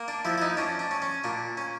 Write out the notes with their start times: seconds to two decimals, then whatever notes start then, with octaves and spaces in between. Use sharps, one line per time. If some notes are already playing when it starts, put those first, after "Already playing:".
Already playing: A#3
0.08 D4
0.25 F3 E4
0.38 E4
0.42 D#4
0.57 C#4 D4
0.79 D4
0.91 C#4
1.02 C#4
1.24 A#2 D4
1.57 C#4